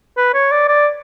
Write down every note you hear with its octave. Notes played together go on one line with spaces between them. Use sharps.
B4
C#5
D5
D5